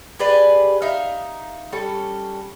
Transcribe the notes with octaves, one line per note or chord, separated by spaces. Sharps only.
G4 G#4 B4 D5
D#4 E5 F5
G3 C#4 A4